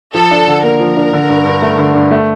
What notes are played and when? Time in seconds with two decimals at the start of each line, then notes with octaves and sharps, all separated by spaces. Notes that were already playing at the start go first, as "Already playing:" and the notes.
0.14 F3 A4
0.31 D4
0.47 D3
0.63 A#3 A#4
0.80 F3
0.97 D4
1.13 D3
1.29 G2
1.45 G2
1.62 A3
1.78 D3
1.95 G2
2.11 A3